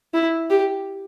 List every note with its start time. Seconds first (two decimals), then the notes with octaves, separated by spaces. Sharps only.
0.14 E4
0.50 G4